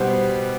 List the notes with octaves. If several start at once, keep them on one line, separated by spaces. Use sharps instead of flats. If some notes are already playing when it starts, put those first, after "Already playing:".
Already playing: B2 G3 B3 C5